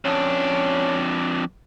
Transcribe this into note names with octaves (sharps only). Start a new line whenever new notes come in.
F2 C#4 D4